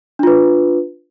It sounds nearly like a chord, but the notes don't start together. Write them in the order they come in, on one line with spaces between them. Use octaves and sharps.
D4 F4 B4